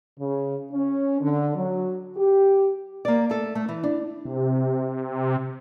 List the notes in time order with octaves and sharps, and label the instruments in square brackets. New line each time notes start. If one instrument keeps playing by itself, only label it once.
[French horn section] C#3
C#4
D3
F#3
G4
[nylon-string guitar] A#3 D5
A3 A4
A3
E3
D4
[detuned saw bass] C3